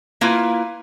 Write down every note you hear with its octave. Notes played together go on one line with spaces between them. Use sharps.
A#3 E4 F4 B4